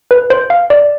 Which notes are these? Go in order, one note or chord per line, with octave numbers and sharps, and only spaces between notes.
B4
C5
F5
D5